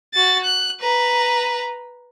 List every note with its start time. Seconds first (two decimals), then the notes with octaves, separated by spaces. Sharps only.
0.14 F#4 A6
0.44 F#6
0.81 B4 A#5